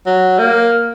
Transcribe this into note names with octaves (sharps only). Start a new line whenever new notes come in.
F#3
A#3